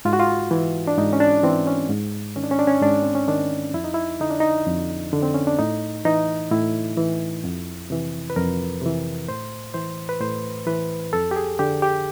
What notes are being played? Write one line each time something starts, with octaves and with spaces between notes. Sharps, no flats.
G#2 F4
F#4
F4
E3
D4
G#2 D#4
C#4
D4
E3 C4
C#4
G#2
D#3 C#4
D4
C#4
D4
C#4
G#2 D4
C4
C#4
D#3 D4
F2 E4
D#4
E4
D3 D#4
D4
D#4
F2
D3
C4
C#4
D4
A2 D#4
E3 D#4
A2 E4
E3
F2
C3 E3
B4
F2 A#4
C3 E3
A2 C5
E3 C5
B4
A2 C5
E3 B4
F2 A4
G4
G#4
D3 G4
G4